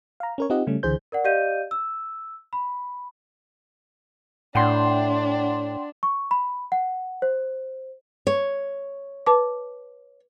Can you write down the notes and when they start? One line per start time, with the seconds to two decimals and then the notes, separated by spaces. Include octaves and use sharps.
0.20 F5 A#5
0.38 C#4 A#4 C#5
0.50 C4 D#4 F4 G4 D#5 F#5
0.67 C#3 G3 A3 C#4
0.83 C#2 D3 E3 G#4 C5 G6
1.12 A#4 D5 F#5
1.24 G4 D5 D#5 F5 G6 D#7
1.71 E6
2.53 B5
4.55 A2 D4 F#5 G5 C6
6.03 C#6
6.31 B5
6.72 F#5
7.22 C5
8.27 C#5
9.26 B4 A5 D6